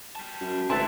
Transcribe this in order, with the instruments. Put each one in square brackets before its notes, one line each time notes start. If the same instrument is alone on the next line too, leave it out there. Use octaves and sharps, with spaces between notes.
[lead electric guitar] G3 A5
[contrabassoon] F#2
[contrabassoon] G#1 [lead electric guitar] G2 E4 [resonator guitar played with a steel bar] A3 B4 A5 [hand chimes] C6 A6